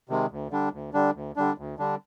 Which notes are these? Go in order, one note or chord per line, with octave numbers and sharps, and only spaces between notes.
C3 D#3 G#3
D2
D3 G3 D4
D2
D3 G3 D4
D2
D3 G3 D4
D2
D3 G3 D4